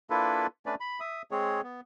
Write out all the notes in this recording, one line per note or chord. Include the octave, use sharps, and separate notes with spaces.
A#3 D4 E4 F4 A4 B4
A3 C#4 D4 B4 D5
B5
E5 D#6
G#3 C4 G#4 C#5
B3